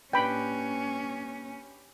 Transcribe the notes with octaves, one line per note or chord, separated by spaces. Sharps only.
A2 A#3 C#4 D4 G4 B4 G5 B5